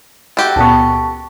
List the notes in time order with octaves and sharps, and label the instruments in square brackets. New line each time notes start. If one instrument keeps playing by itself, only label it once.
[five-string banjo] F#4 G4 A4
[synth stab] C#2 A#2 B3 [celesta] A5 C#6